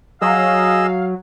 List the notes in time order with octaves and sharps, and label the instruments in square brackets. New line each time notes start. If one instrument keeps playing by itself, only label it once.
[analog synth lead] F#3 [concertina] G#4 D#5 E6 [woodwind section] F5